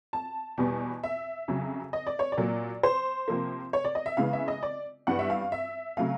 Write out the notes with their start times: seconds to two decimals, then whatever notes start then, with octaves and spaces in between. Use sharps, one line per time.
0.13 A5
0.58 E2 B2 G3 B3
1.04 E5
1.48 F2 C#3 F#3
1.93 D#5
2.07 D5
2.19 C#5
2.32 D5
2.37 A#2 F#3 A#3
2.83 C5
3.28 C3 F3 A#3
3.73 C#5
3.85 D5
3.95 D#5
4.06 E5
4.17 C#3 E3 G#3 B3 F5
4.33 E5
4.48 D#5
4.63 D5
5.07 G2 E3 G3 B3 F#5
5.19 E5
5.30 F5
5.52 E5
5.97 C#3 F#3 A3 F5